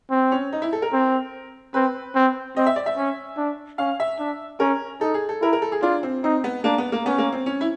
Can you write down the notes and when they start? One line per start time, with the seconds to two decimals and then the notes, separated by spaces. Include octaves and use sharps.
0.11 C4
0.32 C#4
0.52 D#4
0.62 E4
0.73 A4
0.82 A#4
0.93 C4
1.74 C4 B4
2.15 C4
2.56 C4 D#5
2.66 E5
2.76 D5
2.86 E5
2.97 C#4
3.37 D4
3.78 C#4 F5
4.00 E5
4.19 D4
4.60 C#4 A#4
5.01 D#4 A4
5.14 G#4
5.29 A4
5.42 E4 A#4
5.53 A#4
5.62 A4
5.72 G#4
5.82 D4 F4
6.03 C4
6.24 C4 D#4
6.44 B3
6.64 A#3 D4
6.78 B3
6.92 A#3
7.05 B3 C#4
7.18 A#3
7.32 C4
7.46 C#4
7.61 E4